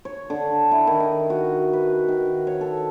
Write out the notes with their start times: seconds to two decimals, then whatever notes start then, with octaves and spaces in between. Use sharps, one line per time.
0.05 C#5
0.30 D3
0.71 E4
0.87 D#3
1.00 D#5
1.30 F#4
1.73 B4
2.08 D#3
2.47 C#5
2.61 A4